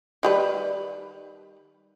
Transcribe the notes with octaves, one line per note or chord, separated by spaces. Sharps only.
D#3 G3 B4